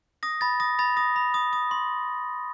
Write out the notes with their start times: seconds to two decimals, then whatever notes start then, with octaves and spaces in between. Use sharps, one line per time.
0.23 D#6 A#6
0.41 B5 A6
0.60 D#6 A#6
0.79 B5 A6
0.97 D#6 A#6
1.16 B5
1.34 D#6
1.53 D#6
1.71 C6